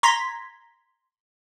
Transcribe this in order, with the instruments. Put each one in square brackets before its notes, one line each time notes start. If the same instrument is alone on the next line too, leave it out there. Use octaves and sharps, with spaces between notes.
[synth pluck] A#5 C6 G#6 A#6 B6